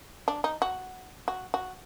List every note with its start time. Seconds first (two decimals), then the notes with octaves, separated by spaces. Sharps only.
0.28 D4
0.44 D#4
0.62 F#4
1.28 F#4
1.54 F#4